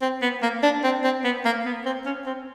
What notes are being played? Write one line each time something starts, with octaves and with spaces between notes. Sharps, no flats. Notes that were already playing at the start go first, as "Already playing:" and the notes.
C4
B3
A#3
D4
C4
C4
B3
A#3
B3
C4
C#4
C4